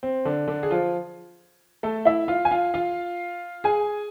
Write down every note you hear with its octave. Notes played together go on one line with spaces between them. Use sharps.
C4
D3 D4
D3 D4
G#4
F3 F4
A3 A4
E4 E5
F4 F5
G#5
F4 F5
F4 F5
G#4 G#5